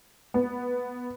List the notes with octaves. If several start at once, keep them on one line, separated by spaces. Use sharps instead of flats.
B3